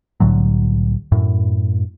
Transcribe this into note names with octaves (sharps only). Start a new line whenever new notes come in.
C2 A2 D3 F#3
F#2 A2